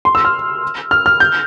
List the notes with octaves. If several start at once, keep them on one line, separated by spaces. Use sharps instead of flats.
C6
E6
F6
F6
F6
G6